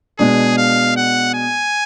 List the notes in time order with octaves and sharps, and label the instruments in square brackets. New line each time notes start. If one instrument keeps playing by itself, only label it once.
[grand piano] B2 G#3 D4 [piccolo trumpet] G#4
[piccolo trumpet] F5
F#5
G#5